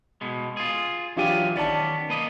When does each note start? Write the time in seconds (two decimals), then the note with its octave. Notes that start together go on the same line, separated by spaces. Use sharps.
0.21 B2 G#3
0.57 F4 G#4
1.17 E3 F#3 D4 F4 G4 G#5
1.56 D#3 B3 C#4 D5 A5
2.09 A#3 B4 D#5